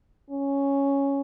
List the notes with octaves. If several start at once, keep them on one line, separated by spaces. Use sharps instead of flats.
C#4